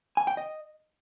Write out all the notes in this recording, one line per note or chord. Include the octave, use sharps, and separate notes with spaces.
G#5
G5
D#5